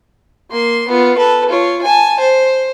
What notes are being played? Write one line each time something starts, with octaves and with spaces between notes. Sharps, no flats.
A#3 C6
B3 F4
A4 B4
F4 C#5
G#5 A5
C5